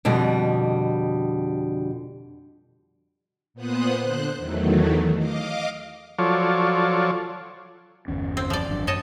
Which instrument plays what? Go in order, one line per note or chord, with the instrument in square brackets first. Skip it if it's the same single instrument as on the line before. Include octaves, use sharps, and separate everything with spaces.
[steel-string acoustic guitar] F2 B2 D3 G3
[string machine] A#2 B3 C5 D#6 F#6
D3 C5 F#6
E2 D#3 E3 F#3 A3
D#5 F5 D6
[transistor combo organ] F3 F#3 F4 A4 C#5 D5
[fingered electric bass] G1 E2 C#4
[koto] C4
F3 D5
[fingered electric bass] G#1 F#2 D4
[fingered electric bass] F#2 [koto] C#5 D#5 A5